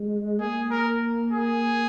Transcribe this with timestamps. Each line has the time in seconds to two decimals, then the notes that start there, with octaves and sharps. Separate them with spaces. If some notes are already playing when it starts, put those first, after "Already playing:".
Already playing: G#3
0.39 A#3 G#4
0.71 A#4
1.32 G#4